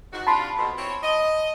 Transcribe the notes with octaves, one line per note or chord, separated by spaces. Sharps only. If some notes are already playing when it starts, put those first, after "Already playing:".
G#2 F#4
C3 D4 F4 A5 B5 C6
F2 B2
C4 E4 C#5
D#5